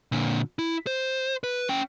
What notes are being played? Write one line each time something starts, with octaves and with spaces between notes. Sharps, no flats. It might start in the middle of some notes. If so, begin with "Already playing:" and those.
A#2 D3
E4
C5
B4
C#4 G5